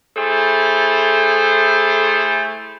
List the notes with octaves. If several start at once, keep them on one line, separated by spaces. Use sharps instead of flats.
A3 E4 G#4 A4 C5